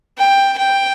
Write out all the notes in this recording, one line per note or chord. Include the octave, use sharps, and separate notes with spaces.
G5
G5